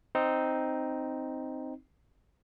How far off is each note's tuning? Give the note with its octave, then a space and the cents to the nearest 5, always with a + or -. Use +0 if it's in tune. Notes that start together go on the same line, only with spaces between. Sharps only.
C4 +0 D#4 +0